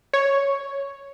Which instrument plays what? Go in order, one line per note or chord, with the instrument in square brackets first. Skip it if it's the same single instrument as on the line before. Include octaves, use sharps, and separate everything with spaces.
[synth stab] C#5